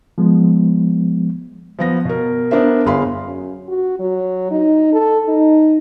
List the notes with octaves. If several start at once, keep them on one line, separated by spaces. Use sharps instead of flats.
F3 G#3 B3
F3 B3 A#6
B2 A#4
B3 D4 A#4 C5 E5
G1 G#4 F5 B5 C6
F#2
F#4
F#3
D#4
A4
D#4